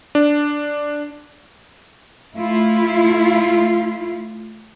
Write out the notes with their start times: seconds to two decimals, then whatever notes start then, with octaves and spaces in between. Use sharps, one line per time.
0.15 D4
2.35 A3 E4 F4